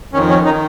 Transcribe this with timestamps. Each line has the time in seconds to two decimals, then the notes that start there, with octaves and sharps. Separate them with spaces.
0.13 F2 D#3 C#4
0.29 C#4
0.45 D#4
0.48 D#3